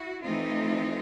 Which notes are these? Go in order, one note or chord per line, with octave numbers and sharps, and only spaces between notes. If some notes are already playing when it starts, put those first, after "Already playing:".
Already playing: E4 F#4
E3 A3 C4 D#4 F4